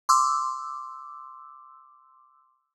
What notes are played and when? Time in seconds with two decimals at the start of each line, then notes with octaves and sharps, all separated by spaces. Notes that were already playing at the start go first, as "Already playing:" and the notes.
0.09 C6 D6 E6